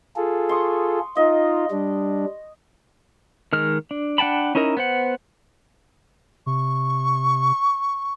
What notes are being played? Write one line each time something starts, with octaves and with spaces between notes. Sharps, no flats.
F4 G#4 A4
C6 C#6 D#6
D#4 F4 D#5
G3 D4
D#3 G#3 F6
D4
D4 F#5 G5 A5 B5
C#4 D#4 E4 A#4 D#5
B3 C5 F#5
C3 C#6